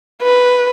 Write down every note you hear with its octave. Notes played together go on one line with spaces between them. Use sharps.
B4